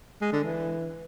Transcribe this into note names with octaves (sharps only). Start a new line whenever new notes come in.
G#3
D3
E3